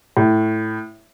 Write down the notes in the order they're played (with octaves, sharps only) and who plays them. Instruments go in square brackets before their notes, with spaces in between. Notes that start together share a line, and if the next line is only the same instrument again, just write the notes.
[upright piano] A2